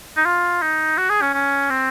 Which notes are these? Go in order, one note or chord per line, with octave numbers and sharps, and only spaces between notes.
D#4
F4
D#4
F#4
G#4
C#4
C#4
C4